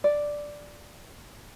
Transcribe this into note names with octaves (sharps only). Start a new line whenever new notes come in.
D5